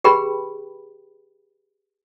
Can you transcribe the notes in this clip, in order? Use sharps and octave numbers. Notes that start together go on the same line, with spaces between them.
G4 G#4 B4 G5 B5